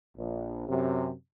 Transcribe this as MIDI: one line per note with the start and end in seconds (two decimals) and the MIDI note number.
0.16 0.68 34
0.69 1.11 42
0.69 1.11 48